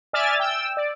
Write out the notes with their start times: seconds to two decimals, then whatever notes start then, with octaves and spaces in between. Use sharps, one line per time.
0.13 D5 E5 G#5 F6 A6
0.40 G5 E6
0.77 D5